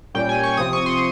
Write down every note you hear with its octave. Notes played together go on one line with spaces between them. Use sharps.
A#2 G3 C#4 G5
G#5
C#6
C3 F3 C4 D#6
C#6
C6